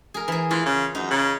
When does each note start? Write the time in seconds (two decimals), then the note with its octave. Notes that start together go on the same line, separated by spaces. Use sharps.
0.14 G#4 A#4
0.28 E3 G#4
0.51 E3 F4
0.66 C#3
0.95 F#2 D#4
1.10 C#3